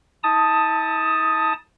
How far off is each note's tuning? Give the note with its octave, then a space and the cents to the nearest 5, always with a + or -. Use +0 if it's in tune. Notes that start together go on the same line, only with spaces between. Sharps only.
E4 -45 A5 +10 D#6 +0